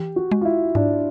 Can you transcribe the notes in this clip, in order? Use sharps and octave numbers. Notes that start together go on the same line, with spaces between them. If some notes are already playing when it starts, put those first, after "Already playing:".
Already playing: E3 G4
F#4
G#3
F4
E4
G#2 D4